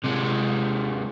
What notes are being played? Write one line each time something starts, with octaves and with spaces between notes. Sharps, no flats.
C3 G#3